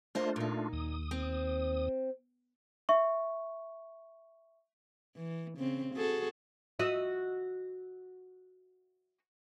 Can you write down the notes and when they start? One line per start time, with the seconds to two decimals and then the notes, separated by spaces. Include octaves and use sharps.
0.15 A3 A#3 D4 F4 C5 D#5
0.36 A#2 D#4
0.73 D#2 D#6
1.11 C4
2.89 E5 C#6
5.16 E3
5.58 C#3 C4
5.95 F#4 G#4 A4
6.79 F#4 D#5 E5